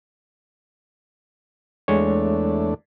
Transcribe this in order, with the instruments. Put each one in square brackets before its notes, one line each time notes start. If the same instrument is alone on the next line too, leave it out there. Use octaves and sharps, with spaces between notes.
[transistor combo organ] E2 A3 D4 [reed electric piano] G#3 C#5